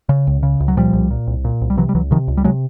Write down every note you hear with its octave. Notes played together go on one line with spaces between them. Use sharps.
C#3
C#2
C#3
C#2
F#3
A#2 F3 G3
C2
A#2
C2
A#2
C2
G3
C3 E3 F#3
G3
C#2 E3 F#3
C3 D#3 F3
C#2
G3
C3 F#3 G#3